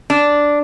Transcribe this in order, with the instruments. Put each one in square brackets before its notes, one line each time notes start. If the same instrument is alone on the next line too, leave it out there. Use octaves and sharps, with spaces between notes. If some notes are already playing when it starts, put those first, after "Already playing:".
[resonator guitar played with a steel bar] D4